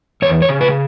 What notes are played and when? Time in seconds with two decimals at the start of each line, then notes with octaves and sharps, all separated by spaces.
0.22 E2 C#5
0.42 C#5
0.49 C#3
0.61 B4